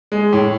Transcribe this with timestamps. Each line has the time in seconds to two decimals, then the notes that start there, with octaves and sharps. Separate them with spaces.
0.12 G#3
0.33 A2